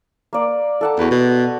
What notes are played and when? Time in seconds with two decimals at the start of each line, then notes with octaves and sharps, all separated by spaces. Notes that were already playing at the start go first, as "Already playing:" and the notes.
0.33 A#3 D5
0.81 A4 F#5 A5
0.99 E2 F#4 B4
1.11 B2 C6